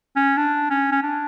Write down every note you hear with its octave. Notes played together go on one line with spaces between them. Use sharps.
C#4
D4
C#4
C#4
D4